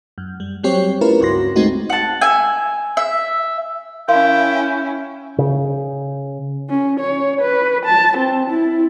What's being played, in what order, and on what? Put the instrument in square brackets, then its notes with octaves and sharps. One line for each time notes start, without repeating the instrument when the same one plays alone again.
[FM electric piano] F#2
G3
F#3 G3 C4 G4 C#5
A3 C#4 E4 F4 A#4 B4
C#2 G2 F#4 C6 A#6
G#3 A3 C4 D#4 F#4
[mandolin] F#5 A5
E5 G#5
E5
[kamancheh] C#4 E4 [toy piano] A#4 F5 C6 [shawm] G5
[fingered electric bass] C#3
[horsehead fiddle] C#4
C#5
B4
A5
C4
E4